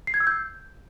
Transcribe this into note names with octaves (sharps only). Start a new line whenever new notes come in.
C7
G#6
E6
G6